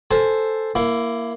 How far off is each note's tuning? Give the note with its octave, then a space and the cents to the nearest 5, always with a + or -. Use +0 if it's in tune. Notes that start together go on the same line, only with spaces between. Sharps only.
A4 +0 C5 +0 G#5 +0
A#3 +0 E4 +20